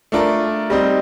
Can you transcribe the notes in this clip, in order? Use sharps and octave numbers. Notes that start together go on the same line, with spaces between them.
A3 D4 F4 A#4
G3 C4 D#4